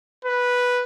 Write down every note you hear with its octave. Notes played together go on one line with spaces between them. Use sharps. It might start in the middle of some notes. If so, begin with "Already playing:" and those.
B4